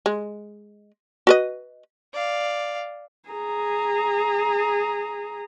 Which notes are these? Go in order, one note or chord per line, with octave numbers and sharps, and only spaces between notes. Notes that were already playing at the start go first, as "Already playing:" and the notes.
G#3
F#4 B4 D#5
D5 F5
G#4 A#5